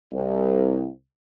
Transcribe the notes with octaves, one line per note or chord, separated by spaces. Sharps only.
C2